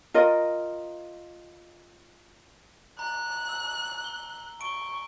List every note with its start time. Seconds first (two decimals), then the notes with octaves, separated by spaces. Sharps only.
0.14 F4 A#4 D#5
2.99 A#5 F#6
3.49 E6
4.04 G7
4.61 C#6 D7 G7